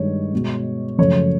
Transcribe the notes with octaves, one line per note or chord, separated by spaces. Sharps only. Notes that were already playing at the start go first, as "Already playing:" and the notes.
Already playing: G2 D#3 G#3 C#5
B2 G#3
F#2 C#3 F3 A3 C#5